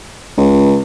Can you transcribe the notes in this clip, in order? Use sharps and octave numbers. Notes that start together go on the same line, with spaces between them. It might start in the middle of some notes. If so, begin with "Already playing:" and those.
C#2